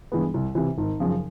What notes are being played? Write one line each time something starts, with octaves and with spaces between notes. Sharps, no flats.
G2 E3 G#3 B3
C2
C3 E3
G#1
F#2 C#3 F3